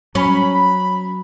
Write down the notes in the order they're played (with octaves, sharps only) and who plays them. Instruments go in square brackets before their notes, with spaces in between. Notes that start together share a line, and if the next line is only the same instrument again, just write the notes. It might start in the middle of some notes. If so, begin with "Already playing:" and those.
[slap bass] F#3 [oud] C#4 [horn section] B5